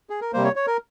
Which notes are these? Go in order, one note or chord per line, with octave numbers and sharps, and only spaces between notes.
G#4
A#4
C3 G3 A#3 C5
C#5
C#5
A#4